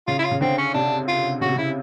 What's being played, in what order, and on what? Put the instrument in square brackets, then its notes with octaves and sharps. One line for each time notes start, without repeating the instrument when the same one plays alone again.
[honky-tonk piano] C#3 [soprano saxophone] F4
[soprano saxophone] E4
F4
[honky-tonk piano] C#3
[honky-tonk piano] D3 [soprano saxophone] C4
[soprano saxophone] C#4
[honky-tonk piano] C3 [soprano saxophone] D4
[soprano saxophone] F4
[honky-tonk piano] C#3 [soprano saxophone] F#4
[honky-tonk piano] C3
[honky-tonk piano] C#3 [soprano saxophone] E4